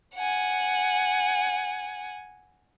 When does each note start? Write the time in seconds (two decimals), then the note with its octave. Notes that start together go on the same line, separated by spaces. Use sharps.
0.15 F#5 G#5